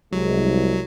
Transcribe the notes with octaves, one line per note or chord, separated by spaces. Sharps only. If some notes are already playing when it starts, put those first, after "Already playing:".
C2 F#3 G#3